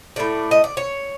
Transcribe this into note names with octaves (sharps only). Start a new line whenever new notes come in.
A2 F#3 A3 D5
D#5
D5
C#5